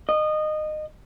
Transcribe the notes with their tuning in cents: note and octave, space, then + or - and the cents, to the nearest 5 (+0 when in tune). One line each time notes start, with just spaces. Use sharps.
D#5 -20